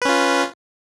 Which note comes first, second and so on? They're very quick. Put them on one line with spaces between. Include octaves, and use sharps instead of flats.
B4 C#4 F4